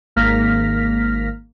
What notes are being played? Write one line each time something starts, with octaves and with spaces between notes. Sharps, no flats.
G#1 A#3 F6 A#6 B6